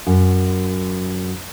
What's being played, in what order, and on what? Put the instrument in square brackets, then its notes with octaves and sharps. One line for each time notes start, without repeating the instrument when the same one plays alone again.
[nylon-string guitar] F#2